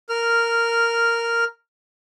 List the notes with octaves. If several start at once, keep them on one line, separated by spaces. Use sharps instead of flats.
A#4 F6